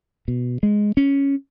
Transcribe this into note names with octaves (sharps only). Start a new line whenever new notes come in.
B2
G#3
C#4